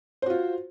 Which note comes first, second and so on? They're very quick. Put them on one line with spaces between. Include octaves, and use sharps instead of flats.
C5 F#4 F4